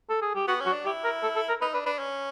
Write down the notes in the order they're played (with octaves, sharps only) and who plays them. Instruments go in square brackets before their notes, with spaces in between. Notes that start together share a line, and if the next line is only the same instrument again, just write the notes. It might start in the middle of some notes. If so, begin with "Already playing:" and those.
[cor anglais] A4
G#4
G4
[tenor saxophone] B3 [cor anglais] F#4
[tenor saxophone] C#4
[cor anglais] F#4
[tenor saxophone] D4
[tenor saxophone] E4 [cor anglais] G4
[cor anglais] A#4
A4
A4
A#4
[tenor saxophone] D#4 [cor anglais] B4
[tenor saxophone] D4 [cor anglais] B4
[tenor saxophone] D4 [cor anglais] B4
[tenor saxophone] C#4